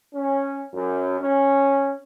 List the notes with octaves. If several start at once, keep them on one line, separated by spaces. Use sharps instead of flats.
C#4
F#2
C#4